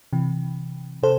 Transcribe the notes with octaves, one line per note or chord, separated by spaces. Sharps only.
C3 E3
C3 A4 C5